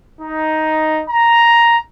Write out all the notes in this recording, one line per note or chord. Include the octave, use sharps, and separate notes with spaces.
D#4
A#5